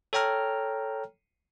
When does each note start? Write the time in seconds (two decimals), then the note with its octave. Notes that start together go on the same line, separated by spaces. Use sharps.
0.13 A4 C#5 G5 A#5 F6